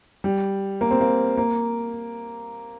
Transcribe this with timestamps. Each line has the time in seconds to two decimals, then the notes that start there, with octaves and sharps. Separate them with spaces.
0.24 G3
0.81 A#3
0.91 C4
1.01 A#3
1.37 A#3